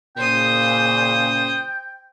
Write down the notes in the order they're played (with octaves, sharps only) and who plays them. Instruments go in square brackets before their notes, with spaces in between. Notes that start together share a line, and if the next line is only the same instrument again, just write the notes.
[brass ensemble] A#2 C#3 [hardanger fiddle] C5 D#6 [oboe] G5